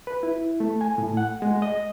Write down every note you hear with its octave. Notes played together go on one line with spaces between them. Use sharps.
B4
E4
A3
G#5
A2
F#5
G#3
D#5